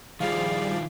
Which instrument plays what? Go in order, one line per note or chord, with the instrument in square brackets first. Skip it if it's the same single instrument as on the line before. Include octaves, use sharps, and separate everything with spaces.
[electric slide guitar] D#3 E4 F4 [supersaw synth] F3 G3 D5 [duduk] G#4 [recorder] F5